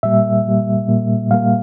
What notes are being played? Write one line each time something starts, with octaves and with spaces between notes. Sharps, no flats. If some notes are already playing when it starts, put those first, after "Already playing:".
A#2 G3 A#3 E5
A#2 G3 A#3
A#2 G3 A#3
A#2 G3 A#3 F5